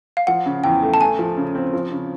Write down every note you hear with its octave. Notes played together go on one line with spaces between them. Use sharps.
F5
F3 F#5
C#3
E2 G5
A3
A5
A3 G#5
F3
C#3
C4
F3
C#3